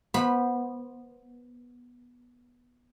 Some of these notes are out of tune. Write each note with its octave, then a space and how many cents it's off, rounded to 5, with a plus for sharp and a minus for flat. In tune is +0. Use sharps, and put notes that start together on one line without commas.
B3 -15 C5 +0 B5 +0